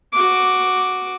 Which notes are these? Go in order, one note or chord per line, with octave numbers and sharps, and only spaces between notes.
F#4 D6